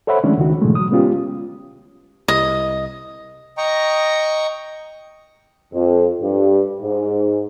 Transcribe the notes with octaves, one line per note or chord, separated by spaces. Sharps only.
A4 C5 C#5 E5 F#5 B5
D#3 F3 G#3 A3 C#4 D4
C#2 D#3 F#4
G#2 B2 D3 E3 G#3 A3
F#3 D#6
G#3 B3 C#4 F4 G4
C2 D#5
D#5 G5 A#5 C#6
F2
G2
G#2